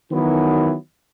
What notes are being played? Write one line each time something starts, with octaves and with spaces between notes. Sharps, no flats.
D#3 E3 F#3 B3